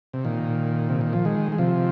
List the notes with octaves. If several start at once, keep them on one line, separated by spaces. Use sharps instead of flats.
C3
A#2 D#3
C3
D#3
F3
D#3 G#3
G#3
C3 F3